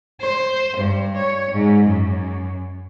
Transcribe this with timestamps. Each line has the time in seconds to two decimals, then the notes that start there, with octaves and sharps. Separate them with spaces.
0.21 C5
0.77 G2
1.17 C#5
1.52 G#2
1.85 F#2